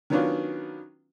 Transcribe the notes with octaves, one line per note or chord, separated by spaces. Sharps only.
D#3 F#3 B3 C#4 D4 F4